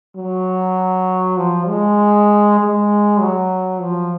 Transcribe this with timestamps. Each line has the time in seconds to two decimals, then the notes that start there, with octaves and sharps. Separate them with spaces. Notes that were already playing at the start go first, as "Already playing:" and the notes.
0.16 F#3
1.37 F3
1.68 G#3
2.59 G#3
3.20 F#3
3.81 F3